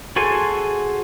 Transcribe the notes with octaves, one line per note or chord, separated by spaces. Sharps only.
F#4 G#4 A4 C5 G#5